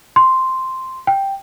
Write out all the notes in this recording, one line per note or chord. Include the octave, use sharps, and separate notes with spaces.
C6
G5